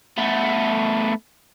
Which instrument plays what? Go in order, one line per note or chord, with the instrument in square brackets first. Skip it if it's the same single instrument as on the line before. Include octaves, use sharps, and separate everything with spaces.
[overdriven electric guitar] A3 B3